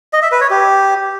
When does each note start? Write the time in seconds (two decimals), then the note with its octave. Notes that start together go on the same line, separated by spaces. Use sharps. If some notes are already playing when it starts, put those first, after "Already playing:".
0.13 D#5
0.22 E5
0.32 B4
0.41 C#5
0.50 G4